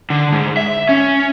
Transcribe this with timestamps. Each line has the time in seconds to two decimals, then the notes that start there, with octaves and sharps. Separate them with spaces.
0.10 D3
0.33 G#2
0.57 E5
0.89 C#4